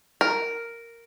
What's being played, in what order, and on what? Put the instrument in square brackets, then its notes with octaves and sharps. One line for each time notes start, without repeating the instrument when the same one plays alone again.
[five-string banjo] A#4